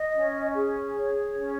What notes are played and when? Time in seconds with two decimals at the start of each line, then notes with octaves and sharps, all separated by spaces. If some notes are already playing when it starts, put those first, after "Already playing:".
Already playing: D#5
0.14 C#4
0.54 G#4
0.95 C#5
1.37 C#4